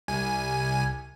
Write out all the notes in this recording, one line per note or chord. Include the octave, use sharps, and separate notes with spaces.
C2 G#5